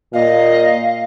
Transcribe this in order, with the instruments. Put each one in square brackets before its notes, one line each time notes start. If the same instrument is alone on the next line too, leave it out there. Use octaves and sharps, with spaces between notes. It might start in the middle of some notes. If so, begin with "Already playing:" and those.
[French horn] A#2 [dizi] D#5 [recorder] F5